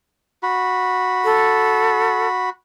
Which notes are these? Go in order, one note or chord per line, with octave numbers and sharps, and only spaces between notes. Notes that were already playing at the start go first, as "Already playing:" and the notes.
F#4 B5
A4